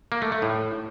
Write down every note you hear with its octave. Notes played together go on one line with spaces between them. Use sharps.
A#3
A3
A3
A2